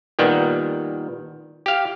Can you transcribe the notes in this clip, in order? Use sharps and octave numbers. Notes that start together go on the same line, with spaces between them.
A#2 D#3 G3 B3
G4 F5